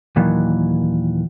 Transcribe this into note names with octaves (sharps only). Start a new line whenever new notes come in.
D#2 A#2 D#3 E3 F#3